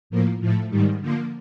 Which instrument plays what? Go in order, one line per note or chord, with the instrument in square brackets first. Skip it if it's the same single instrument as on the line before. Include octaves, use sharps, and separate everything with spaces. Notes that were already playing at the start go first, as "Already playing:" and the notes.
[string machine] A2 F3 A#3
A2 F3 A3
G#2 D#3 G3
D3 F3 A#3